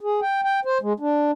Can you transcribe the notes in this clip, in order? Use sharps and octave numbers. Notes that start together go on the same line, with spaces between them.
G#4
G5
G5
C5
G#3
D4